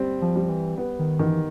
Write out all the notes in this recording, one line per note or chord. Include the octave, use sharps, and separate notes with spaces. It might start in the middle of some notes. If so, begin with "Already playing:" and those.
Already playing: G3 C4
F3
G3
E3
B3
D#3
D#3 E3